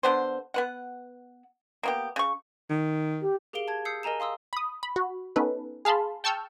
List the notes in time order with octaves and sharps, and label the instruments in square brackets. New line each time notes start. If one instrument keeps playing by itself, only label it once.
[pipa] D3 B3 C5
B3 B4 F#5
A#3 B3 G4
C#3 C#6
[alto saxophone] D#3
[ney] G4
[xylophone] G4 G#4 A#4 F5 D7 G7
A5 G#6
D#6 E6 G6 C7 C#7
A#4 D#5 G#5 A#5 E7
F5 C6 D#6 E6
[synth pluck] B5 D#6
B5
F#4
B3 C#4 D#4 A4 B4
G#4 F5 A5 B5 C6
G5 A5 C#6 E6 F6 G6